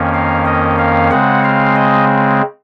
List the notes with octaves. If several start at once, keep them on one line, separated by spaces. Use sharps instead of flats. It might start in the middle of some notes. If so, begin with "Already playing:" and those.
Already playing: F2 D#3 A#3 C#4
F5
D#5
F5
C#3 G#3 C4 F#5
F5
D#5